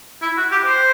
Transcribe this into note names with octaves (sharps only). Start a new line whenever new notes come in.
E4
F#4
G4
C5